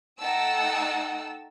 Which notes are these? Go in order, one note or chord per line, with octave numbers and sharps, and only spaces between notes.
A3 D#4 F#5 G5 A5 E6